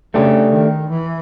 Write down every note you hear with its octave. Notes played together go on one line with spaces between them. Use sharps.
C#3 A3 D4 G4
D#3
E3